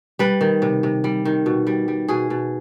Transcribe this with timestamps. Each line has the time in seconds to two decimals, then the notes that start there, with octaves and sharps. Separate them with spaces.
0.19 G3 B4
0.41 D#3
0.62 C3
0.83 C3
1.04 G3
1.25 D#3
1.46 B2
1.67 G3
1.88 G3
2.08 B2 G#4
2.30 B2